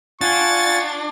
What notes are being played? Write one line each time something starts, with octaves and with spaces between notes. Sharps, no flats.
D4 F4 F#5 G#5 C#6 A6